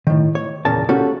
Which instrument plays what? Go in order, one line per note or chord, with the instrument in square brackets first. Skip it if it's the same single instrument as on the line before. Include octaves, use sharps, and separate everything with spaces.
[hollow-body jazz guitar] A2 D#3
C#5
E2 A#2 C#3 A#4 A5
A#3 C#4 F#4 G4 A4